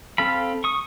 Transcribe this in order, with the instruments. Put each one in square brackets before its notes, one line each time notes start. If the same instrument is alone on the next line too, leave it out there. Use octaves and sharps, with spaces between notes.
[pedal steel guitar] C4 A4 F5 B5
C#6 D#6